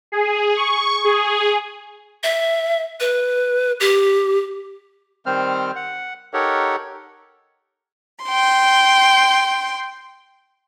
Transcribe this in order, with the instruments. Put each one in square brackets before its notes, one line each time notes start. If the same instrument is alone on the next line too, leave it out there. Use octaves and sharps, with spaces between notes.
[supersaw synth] G#4
C#6
G#4
[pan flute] E5
B4
G4
[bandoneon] D#3 G3 C4 C5 F6
F#5
D#4 G4 A4 A#4 C#5 F#5
[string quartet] G5 C6